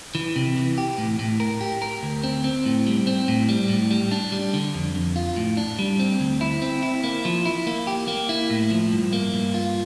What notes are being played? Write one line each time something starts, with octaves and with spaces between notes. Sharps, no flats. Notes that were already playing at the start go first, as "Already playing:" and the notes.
E3
C3
E3
G4
A2
A2
A#4
G4
A#4
D2
C4
C4
A2
G3
C4
A2
G3
A2
G3
D4
G3
D3
F2
F2
F4
A2
D4
G3
C4
D2
E4
C4
E4
A#3
F3
E4
A#3
G4
A#3
E4
A2
F3
G2
A#3
G2
F4